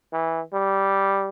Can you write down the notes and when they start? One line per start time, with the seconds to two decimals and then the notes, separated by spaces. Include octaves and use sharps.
0.13 E3
0.53 G3